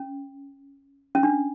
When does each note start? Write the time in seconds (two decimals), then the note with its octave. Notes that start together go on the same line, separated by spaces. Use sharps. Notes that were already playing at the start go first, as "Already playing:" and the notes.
Already playing: C#4
1.15 C#4
1.23 D4